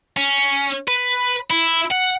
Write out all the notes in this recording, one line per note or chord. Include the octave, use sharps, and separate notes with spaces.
C#4
B4
E4
F#5